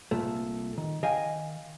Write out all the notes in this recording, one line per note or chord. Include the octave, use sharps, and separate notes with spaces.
C2 A#2 A3
D#3
D#3 D#5 F5 G5 G#5